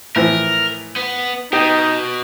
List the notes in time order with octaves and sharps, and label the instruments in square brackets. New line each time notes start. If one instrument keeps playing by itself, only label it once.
[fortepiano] A2 E3 F3 [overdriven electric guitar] A#4
[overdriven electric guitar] B3
[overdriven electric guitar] B2 [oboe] D#4 [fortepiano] G4